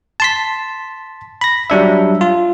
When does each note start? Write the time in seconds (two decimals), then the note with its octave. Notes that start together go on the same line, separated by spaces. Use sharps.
0.20 A5 C6 B6
1.41 B5 A#6
1.70 F#3 G3 D4 E5
2.21 F4